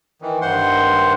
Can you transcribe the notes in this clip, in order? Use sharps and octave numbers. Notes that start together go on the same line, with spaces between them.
D#3 E3
G2 D#3 C5 F#5 C6